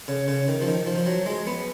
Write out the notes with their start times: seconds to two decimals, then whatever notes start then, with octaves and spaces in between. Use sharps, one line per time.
0.08 C#3
0.28 C#3
0.48 D#3
0.62 F3
0.68 D#3
0.86 F3
0.98 F3
1.06 F#3
1.26 G#3
1.47 B3